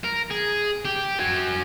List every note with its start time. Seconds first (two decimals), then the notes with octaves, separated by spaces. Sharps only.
0.04 A#4
0.31 G#4
0.85 G4
1.19 F#4 G#5